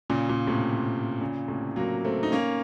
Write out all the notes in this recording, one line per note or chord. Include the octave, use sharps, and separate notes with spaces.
A#2 C#3
A#2
A2 C3
A#2 C#3
A2 C3
F#3 A#3
A3 C4
D#4
A#3 C#4